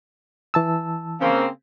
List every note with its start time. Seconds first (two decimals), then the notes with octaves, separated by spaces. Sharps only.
0.54 E3 A5 E6
1.21 C#3 A#3 C4